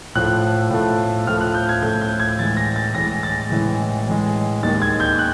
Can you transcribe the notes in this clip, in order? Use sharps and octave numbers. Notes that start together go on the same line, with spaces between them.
A2 F3 A3 F#6
A2 F3 A3
A2 F3 A3 F6
F#6
G6
G#6
A2 F3 A3 G6
G6
G#6
A2 E3 G#3 A6
A#6
A6
A2 E3 G#3 A#6
A6
A2 E3 G#3
A2 E3 G#3
D#2 D#3 G#3 A6
G#6
G6
F#6